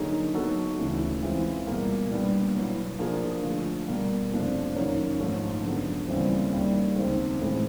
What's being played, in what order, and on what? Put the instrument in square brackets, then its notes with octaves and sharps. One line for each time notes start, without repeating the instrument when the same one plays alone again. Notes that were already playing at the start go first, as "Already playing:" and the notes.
Already playing: [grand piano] D3 F#3 A#3 D#4 G#4
F#3 B3 D#4 F#4 A4
D2 C#3 E3
E3 G#3 C4 F4
B2 G3 A#3
A#2 G3 B3 D4
B2 F#3 B3 E4
F3 A#3 D4 F4 G#4
D3 F3 A3
B2 G3 A#3
F2 C3 F3 A3 D4
F#2 D#3 F#3 A#3 C#4
G#2 F3 A3 C#4
D3 F#3 B3
D#2 C#3 E3 G3 C4
D#2 D#3 G3
C#2 C3 D#3 G#3 C4
A2 E3 G#3 C4 E4